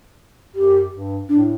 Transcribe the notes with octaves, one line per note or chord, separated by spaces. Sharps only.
F#2 G4
G2
A2 D4